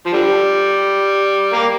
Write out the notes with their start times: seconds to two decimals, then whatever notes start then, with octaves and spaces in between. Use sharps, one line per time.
0.06 F3
0.13 D3 G3
1.53 A#3